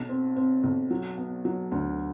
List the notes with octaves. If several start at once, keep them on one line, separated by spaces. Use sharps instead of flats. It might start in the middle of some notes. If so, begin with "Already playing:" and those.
Already playing: B1
C4
C4
B1
F#3
B3
F#3
D2